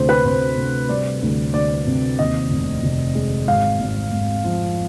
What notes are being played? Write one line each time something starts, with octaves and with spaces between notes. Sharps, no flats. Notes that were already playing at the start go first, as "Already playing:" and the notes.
Already playing: D2 C3 C5
B4
C3 C5
C3
G3 D5
D2
D2 D5
C3
D#2 D#5
F1
F1
G#3
G#1 F5
G#1
G#1
F3